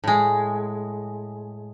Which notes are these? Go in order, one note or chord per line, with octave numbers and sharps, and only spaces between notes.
A2 G#3